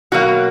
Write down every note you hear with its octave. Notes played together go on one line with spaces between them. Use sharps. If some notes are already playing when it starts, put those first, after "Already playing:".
B2 F#3 A#3 F#4